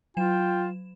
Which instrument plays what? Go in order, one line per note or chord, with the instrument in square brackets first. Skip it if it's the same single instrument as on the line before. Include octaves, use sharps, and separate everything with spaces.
[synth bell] F#3 E7 [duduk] F4 [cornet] G5